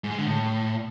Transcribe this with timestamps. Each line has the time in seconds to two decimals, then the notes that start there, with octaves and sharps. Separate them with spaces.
0.04 G#2
0.11 G#3
0.18 D3
0.25 A2